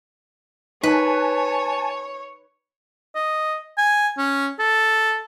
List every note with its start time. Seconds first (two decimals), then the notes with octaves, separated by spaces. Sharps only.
0.83 D#4 B4 C#5 G#5 A5
3.15 D#5
3.78 G#5
4.18 C#4
4.59 A4